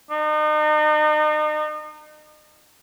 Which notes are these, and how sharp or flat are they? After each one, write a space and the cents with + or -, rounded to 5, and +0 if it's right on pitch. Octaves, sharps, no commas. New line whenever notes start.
D#4 -35